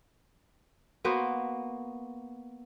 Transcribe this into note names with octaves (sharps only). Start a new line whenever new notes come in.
A#3 B3 F#4 C5